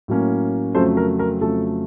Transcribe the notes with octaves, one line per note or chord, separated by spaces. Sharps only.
A2 F#3 A#3 C#4
F2 C#3 F#3 A3 A4 C5
A#4
A#4
F2 C#3 F#3 A3 A4